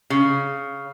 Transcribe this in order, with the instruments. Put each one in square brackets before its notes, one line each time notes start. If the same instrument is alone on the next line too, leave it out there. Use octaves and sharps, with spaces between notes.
[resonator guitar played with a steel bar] C#3